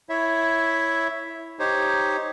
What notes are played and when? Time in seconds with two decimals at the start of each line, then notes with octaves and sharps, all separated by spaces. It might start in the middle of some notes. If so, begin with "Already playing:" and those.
0.09 E4 C#5 E5
1.59 D#4 G4 C5 C#5